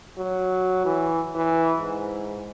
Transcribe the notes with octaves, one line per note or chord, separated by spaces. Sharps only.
F#3
E3
E3
G#2